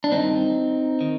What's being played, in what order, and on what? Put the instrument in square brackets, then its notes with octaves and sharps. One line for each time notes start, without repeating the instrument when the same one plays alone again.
[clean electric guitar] D4
G2 D#3 C4 D#4
D#3